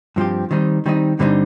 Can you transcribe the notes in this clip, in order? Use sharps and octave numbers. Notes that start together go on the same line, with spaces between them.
G2 F3 C4 G4
D#3 G3 C4 D#4
D#3 G3 C4 D#4
G2 D3 G3 C4 D#4